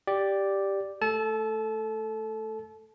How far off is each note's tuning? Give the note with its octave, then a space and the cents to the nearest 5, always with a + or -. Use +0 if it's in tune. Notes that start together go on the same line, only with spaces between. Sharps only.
G4 +0 D5 +0
A3 +0 A4 +0 A5 -30